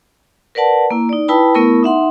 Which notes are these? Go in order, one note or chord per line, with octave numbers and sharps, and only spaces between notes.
A#4 B4 D5 F#5 A5
A#3 E4
D#4 D5
E4 B4 G5 A5 B5 D#6
A3 B3 E4 A#4 B5 C#6
D#4 E5 F#5 C6